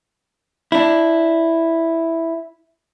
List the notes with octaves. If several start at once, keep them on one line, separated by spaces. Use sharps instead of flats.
D4 E4